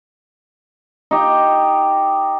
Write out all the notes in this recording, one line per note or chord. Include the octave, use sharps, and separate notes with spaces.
D#4 G4